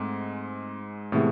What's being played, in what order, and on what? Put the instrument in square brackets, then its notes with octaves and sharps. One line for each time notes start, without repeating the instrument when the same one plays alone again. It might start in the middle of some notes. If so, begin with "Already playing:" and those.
Already playing: [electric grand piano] G#2 G#3 [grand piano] A3 C4
[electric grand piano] A2 A3 [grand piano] C3 E3 G#3 B3